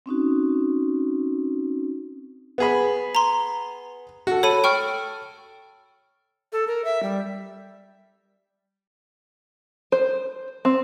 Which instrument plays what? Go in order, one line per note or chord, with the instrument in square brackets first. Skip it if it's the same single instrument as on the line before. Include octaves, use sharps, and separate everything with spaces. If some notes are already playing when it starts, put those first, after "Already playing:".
[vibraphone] C4 C#4 D#4 F#4
[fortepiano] B3 G#4 B5
[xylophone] A#5 C6
[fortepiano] F#4 A4
[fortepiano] A4 [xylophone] C#5 B5 D#7
[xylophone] G5 C#6 F6
[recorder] A4
A#4
E5
G3
[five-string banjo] C5
C4